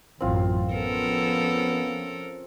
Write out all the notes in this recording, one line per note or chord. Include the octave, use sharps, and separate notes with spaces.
A1 F#2 C4 F4
F3 B3 C#4 A4 A#4